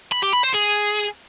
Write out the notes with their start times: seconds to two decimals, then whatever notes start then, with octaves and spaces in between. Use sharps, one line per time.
0.12 B5
0.23 G4
0.33 B5
0.44 C5
0.54 G#4